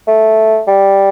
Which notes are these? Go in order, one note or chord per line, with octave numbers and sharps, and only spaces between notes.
A3
G3